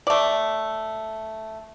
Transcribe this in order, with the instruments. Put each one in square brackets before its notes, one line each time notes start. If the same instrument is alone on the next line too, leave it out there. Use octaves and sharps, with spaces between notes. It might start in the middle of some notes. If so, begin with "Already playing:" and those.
[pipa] A3 D5